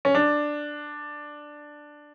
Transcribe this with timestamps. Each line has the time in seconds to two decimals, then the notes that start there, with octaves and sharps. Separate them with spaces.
0.05 C#4
0.15 D4